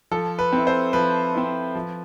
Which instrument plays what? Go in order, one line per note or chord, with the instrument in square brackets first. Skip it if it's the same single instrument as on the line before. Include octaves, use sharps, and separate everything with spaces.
[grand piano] F3 A4
B4
C4 E4
C5
F3 B4
C4 E4
F3